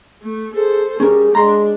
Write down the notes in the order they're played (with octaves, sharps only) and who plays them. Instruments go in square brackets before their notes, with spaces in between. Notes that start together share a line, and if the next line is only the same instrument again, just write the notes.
[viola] A3
[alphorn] G#4 [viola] A4 C5
[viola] G3 [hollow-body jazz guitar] C#4 A#4 [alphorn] G#4
[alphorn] G#3 [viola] D4 [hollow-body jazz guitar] A#5 C6